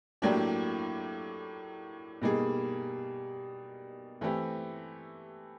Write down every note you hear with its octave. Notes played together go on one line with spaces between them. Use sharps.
A2 F#3 A#3 D4 G4
B2 G3 A#3 D#4 G#4
E3 A3 C4 E4 G4